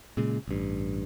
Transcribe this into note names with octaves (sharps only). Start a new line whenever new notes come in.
A#2 C#3 G#3
A1 G2